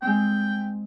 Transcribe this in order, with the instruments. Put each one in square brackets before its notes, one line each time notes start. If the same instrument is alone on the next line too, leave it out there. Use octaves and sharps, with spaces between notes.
[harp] G#3 C4 [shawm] G5